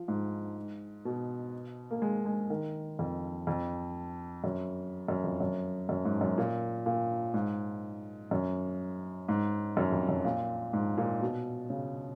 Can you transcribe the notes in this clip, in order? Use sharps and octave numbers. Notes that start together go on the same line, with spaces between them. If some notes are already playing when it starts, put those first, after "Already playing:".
Already playing: F3
G#2
B2
A#3
G#3
G#3
D#3
F2
F2
F#2
F#2
F2
F#2
F#2
G#2
F#2
A#2
A#2
G#2
F#2
G#2
F#2
F2
F#2
A#2
G#2
A#2
B2
C#3